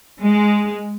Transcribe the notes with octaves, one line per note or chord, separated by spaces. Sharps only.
G#3